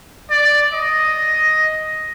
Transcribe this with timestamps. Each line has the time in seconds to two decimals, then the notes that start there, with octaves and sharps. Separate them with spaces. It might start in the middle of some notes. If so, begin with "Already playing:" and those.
0.30 D5
0.73 D#5